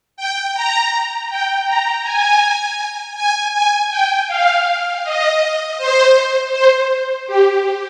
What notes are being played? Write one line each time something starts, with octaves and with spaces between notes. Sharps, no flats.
G5
A#5
G5
A#5
G#5
G#5
G#5
G5
F5
D#5
C5
C5
G4